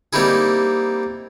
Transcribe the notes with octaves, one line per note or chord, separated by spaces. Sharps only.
G3 A#3 C4 D#4 E4 G#4